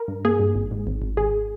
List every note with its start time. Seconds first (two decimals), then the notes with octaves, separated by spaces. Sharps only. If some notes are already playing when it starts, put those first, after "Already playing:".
Already playing: A#4
0.08 G2
0.25 A#3 G#4
0.40 G2
0.55 G#1
0.71 G#2
0.87 G#1
1.02 G#1
1.17 G#1 G#4